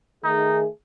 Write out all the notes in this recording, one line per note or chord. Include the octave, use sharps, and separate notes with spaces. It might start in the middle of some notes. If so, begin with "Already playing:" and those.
D#3 A3 D#4 G#4